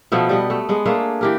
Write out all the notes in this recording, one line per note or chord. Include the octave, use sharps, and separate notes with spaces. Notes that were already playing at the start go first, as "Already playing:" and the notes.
B2 F3 A3 B3
G3 B3 D#5
A3
G#3 B3
A3 A#3 D4 G#4
E3 G4 A#4